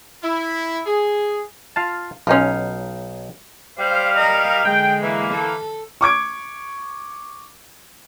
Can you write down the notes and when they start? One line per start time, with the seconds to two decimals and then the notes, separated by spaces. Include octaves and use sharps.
0.23 E4
0.86 G#4
1.76 F4 F5 A5
2.27 B1 C#4 D#4 F4 F5
3.79 G3 C5 F5
4.15 A#4 D#5
4.65 D3 G#3 G5
5.02 E3 A#3
5.34 A4
6.01 C#6 D6 G#6 D7